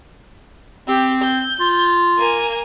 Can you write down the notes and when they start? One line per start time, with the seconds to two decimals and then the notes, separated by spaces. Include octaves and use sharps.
0.88 C4 G4
1.23 G6
1.60 F4
2.18 A#3 G#5